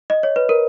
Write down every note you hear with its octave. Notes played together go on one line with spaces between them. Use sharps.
D#5
C#5
B4
A#4